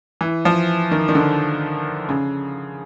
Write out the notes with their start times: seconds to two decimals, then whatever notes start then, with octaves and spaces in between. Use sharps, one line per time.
0.21 E3
0.45 F3
0.91 D#3
1.09 D#3
1.15 D3
2.09 C#3